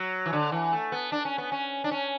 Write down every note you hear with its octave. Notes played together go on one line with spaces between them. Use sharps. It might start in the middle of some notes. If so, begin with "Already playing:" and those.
Already playing: F#3
E3
D3
E3
A3
B3
D4
C#4
B3
C#4
D4
C#4